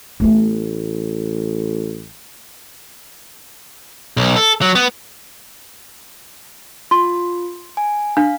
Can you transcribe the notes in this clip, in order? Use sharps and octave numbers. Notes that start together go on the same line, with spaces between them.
A1 A3 B3
B1
A4
F#3
B3
F4 C6
G#5
D4 F5